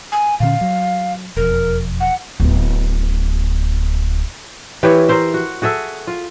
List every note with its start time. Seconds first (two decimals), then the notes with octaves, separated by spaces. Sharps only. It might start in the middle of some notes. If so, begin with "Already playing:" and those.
0.12 G#5
0.40 A#2 D3 C#4 F5
0.61 F#3
1.37 E1 F2 A#4
2.00 F#5
2.40 D1 B3
4.83 E3 G4 B4 C#5
5.08 A#4 C5 E5
5.34 F#4
5.62 F#4 G#4 A4 E5
6.07 F4